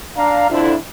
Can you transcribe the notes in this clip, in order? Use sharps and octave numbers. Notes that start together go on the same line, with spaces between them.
D4 F5 A#5
F2 D3 F3 D4 E4